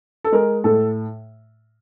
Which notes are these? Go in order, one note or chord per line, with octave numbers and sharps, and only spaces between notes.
A4
G#3 A#4
A2 A4